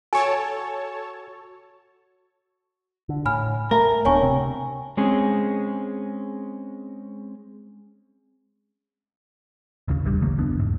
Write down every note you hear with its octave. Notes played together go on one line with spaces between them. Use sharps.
F#4 A4 C#5 G#5 A5 C#6
D3
A2 G#5 B5 F6
A3 A#4
D1 B3 D4 C#5 G#5 C#6
C3 C4
G#3 C4 C#4 G#4
A1 D#2 C#3
D1 A1 G2 G3
C#3 E3 A3 A#3
F#1 D#2 B3 D4
E2 G#2